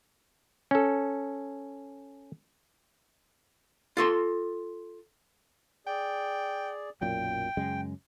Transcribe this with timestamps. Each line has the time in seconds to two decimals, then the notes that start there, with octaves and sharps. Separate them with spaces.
0.71 C#4 A4
3.97 F4 A4 C6
5.87 G#4 D5 G5
7.01 B1 F#2 A#2 G5
7.57 F#2 C#3 G#3